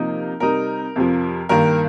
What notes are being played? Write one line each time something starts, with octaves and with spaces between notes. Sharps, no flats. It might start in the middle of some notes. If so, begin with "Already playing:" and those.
Already playing: C3 F3 A#3 D#4 A#4
C3 G3 D#4 A#4
F2 C3 F3
G2 D#3 A#3 A#4